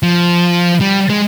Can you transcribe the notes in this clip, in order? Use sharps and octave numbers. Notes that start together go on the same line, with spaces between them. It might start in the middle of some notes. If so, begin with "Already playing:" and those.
F3
G3
G#3